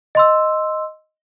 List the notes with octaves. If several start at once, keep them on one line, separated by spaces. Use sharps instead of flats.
D#5 C6 E6